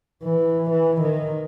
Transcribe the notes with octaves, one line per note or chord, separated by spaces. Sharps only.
E3
E3
D#3